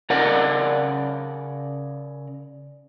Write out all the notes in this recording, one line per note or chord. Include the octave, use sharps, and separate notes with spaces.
C#3 A#4 D5 F#5